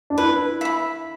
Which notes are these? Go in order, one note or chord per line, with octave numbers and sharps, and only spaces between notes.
D4
E4 B4
E5 B5